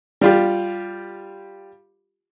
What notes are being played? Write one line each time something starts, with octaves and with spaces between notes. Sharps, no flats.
G3 F4 G4